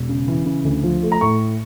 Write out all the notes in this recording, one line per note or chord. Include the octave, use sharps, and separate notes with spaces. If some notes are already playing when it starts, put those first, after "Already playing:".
Already playing: E1
C#3
E3
C#3
D2
F3
A3
A#5
A2 C#6